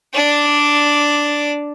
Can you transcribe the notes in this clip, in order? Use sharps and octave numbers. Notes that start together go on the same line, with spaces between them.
D4 D5